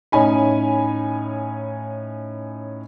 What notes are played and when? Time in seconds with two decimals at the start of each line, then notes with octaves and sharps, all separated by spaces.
0.12 A2 C#4 D#4 G#5 B5